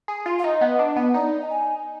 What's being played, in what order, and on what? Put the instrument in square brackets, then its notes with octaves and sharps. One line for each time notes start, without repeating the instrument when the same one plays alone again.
[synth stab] G#4
F4
[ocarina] F5
[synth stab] D#4 [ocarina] D#5
[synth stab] B3
D4
B3
[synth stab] D#4 [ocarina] D5
[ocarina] A#5
G#5